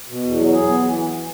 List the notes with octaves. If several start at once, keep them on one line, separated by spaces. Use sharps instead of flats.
B2
E2
F#3
G#4
B3
E3